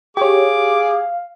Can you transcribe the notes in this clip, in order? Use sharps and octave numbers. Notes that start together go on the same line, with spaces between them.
G4 G#4 C#5 F5 D6